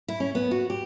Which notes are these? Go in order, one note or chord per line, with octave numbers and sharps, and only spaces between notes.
E4
C#4
B3
F#4
G4